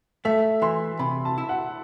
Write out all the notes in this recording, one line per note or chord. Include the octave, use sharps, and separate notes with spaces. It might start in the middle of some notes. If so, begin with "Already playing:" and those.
A3 E5
E3 C6
C3 B5
A5
E4
F#5